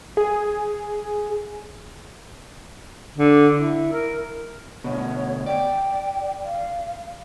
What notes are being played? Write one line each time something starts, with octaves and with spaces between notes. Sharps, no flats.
G#4
D3
E4
A#4
D2 B2 C#5
D5 G5
F5